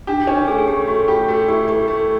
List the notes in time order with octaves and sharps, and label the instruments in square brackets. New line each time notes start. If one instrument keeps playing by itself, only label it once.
[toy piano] D4 [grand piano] G4
[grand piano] C#4 [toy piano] D4
[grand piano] A3 [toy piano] G#4
[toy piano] G#4
[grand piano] A3 [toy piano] G4
[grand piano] A3 [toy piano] F#4
[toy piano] F4 [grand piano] G4
[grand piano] A3 [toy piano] F#4
[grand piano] E4 [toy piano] G4
[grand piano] A3 [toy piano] G4
[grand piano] A3